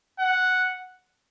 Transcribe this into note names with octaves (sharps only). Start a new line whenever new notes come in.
F#5